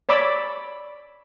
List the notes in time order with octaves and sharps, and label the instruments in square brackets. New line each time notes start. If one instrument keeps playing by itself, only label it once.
[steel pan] C#5 D5 B5 D6 E6